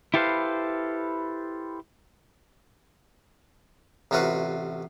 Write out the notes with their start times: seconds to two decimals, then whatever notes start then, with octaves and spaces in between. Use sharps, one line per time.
0.14 E4 G4 A4 B4 C5 F5
4.11 A1 C3 F4 F#4 B4 F5